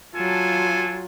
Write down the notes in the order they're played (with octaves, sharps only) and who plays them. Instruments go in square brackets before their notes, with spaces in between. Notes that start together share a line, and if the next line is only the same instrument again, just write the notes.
[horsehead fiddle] F#3 F4 [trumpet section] D4 A4 G#5